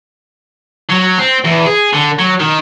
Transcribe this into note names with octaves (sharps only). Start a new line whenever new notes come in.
F#3
C4
E2
G#4
D3
F#3
D#3